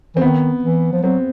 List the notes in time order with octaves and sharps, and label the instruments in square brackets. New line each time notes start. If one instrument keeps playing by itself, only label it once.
[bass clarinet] E3 [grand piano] C4
[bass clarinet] D#3 [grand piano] B3
[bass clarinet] E3
F3
[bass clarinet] F#3 [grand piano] C4